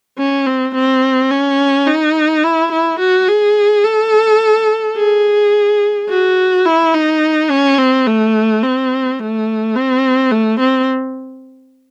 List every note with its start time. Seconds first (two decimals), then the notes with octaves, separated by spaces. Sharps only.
0.18 C#4
0.46 C4
0.75 C4
1.31 C#4
1.87 D#4
2.44 E4
2.72 E4
3.00 F#4
3.28 G#4
3.84 A4
4.97 G#4
6.09 F#4
6.66 E4
6.94 D#4
7.51 C#4
7.78 C4
8.06 A3
8.63 C4
9.19 A3
9.75 C4
10.31 A3
10.60 C4